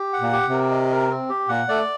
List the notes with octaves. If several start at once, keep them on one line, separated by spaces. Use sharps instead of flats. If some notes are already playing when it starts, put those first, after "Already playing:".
Already playing: G4
F#5
A#2
G4
C3
A#4
D#5
A#4
C4
G4
A#2 F#5
A3 D5